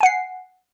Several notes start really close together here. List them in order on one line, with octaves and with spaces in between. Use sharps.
G#5 F#5 C7